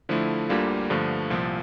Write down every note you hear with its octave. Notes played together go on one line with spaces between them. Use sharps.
D3 F3 A3 E4
D2 D3 G3 A#3 F4
G2 D3 F3 A3
C2 A#2 F3